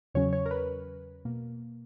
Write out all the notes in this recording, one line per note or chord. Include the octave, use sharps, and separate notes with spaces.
E2 C#3 F#3 C#4 C#5
C#5
A#4
B4
B2 A#3